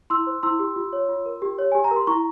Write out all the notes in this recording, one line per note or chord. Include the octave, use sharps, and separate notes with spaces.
E4 C6 E6
C5
E4 C6 E6
G4
F4
C#5
F4
A#4
G4
C#5
G4 G#5
A#5
A#4
C6
E4 A#5 C#6